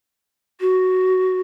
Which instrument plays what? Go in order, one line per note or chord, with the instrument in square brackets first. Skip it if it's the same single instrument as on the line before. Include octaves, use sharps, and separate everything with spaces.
[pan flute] F#4